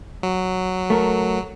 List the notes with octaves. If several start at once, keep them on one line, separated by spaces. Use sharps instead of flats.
F#3
A3 A#4